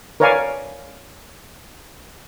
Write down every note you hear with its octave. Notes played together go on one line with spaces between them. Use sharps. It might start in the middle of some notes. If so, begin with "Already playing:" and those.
A#4 B4 C#5 D5 F5 G#5